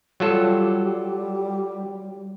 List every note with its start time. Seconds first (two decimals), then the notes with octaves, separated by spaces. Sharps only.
0.20 F#3 G3 F4 A4